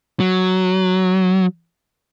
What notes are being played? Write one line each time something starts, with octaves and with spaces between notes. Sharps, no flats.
F#3